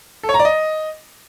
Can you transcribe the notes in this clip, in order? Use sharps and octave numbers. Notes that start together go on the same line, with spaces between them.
A4
C#5
A#5
D5
D#5